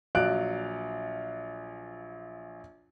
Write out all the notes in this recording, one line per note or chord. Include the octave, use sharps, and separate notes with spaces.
A#1 F#3 D5 F5 F#6 D7